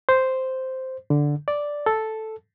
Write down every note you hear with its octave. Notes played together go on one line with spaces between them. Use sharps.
C5
D3
D5
A4